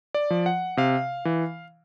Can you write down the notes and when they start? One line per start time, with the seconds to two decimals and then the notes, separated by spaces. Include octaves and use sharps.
0.15 D5
0.30 F3
0.46 F#5
0.77 C3 F5
1.25 E3